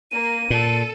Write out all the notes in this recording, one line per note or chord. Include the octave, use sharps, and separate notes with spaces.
A#3 D#7
A#2 A4